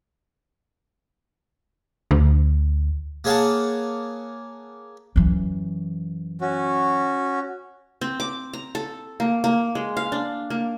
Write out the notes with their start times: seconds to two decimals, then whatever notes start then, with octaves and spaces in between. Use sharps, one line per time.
2.11 D2
3.24 A#3 G#4 C#5 F5 F#5 A5
5.16 F#2 E3
6.41 C#4 F#4
8.01 C4
8.20 D6
8.53 A#5
8.75 A4
9.20 A#3
9.44 A#3
9.75 G#3
9.97 F5
10.12 D4
10.50 A#3